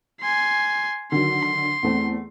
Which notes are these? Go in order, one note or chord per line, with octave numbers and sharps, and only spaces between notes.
G#5 C6
D3 D#3 F#3 C6
E2 A3 C4